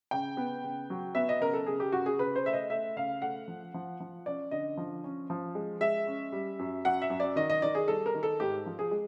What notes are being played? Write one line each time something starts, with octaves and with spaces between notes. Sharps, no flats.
C#3 G5
B3
C#3
F#3
B3 E5
D#5
C#3 A#4
A4
C#3 G#4
G4
C#3 F#4
G#4
C#3 B4
C5
A3 E5
D#5
A3 E5
C#3 F5
A3 F#5
F3
F3
F3
C#4 D5
D3 D#5
F3
C#4
F3
G#3
G#3 E5
C#4
G3
F#2
F#2 F#5
E5
F#2
D5
D#3 D#5
D#5
D#3 D5
G#4
G3 A4
A#4
D#3
A4
G#2 G4
F3
G#4
G#3